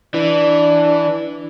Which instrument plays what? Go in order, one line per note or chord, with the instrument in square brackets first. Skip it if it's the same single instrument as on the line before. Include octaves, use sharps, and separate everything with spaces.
[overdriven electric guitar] E3 [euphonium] D4